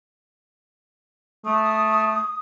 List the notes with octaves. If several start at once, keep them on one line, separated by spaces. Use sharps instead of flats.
A3 D#6